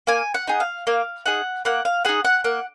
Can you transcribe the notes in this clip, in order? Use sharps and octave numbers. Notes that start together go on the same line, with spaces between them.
A#3 G#5
F#5
D#4 G#4
F5
A#3 F5
D#4 G#4 F#5
A#3 F#5
F5
D#4 G#4 F#5
F#5
A#3 F#5